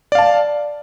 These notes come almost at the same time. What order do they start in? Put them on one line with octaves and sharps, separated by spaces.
D5 F5 A5